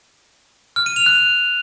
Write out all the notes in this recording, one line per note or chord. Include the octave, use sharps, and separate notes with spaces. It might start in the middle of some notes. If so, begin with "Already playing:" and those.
F6
D#7
F7
F#6